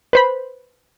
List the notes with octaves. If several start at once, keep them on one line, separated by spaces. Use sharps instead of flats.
B4 C5 B5